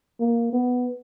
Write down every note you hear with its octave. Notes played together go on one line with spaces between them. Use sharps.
A#3
B3